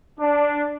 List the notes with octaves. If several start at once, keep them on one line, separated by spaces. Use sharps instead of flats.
D4